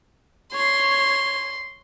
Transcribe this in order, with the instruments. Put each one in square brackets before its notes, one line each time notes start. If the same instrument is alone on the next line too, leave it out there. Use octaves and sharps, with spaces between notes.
[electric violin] C#5 [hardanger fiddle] C6